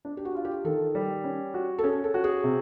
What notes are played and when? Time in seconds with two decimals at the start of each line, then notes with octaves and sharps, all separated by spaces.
0.05 D4
0.17 G4
0.25 F#4
0.35 F4
0.45 G4
0.64 D#3 A4
0.95 G3
1.24 C#4
1.54 F#4
1.78 A4
1.83 C#4 G#4
2.04 A4
2.14 F#4
2.24 G#4
2.43 C3